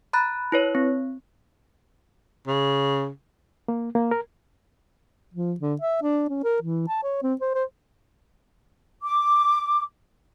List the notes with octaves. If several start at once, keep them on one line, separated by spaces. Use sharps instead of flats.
A#5 B5 F#6 A6
E4 B4 C#5
C4
C#3
A#3
A#3
A#4
F3
D3
E5
D4
C#4
A#4
E3
A5
C#5
C4
C5
C5
D6